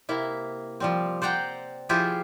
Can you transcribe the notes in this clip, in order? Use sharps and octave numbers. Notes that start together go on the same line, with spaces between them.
C3 A#3 E4
F3 G3 C4
C5 D5 F#5 G5 A#5
F3 E4 F4 G4 G#4 C5